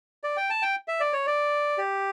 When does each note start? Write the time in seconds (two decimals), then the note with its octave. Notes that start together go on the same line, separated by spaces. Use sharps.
0.24 D5
0.37 G5
0.50 A5
0.62 G5
0.88 E5
1.00 D5
1.13 C#5
1.27 D5
1.78 G4